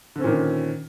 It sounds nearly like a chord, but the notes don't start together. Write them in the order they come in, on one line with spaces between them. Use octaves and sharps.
D3 C4 C#4 A#2 D#3